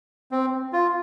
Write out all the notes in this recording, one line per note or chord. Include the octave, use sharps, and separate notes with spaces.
C4
F4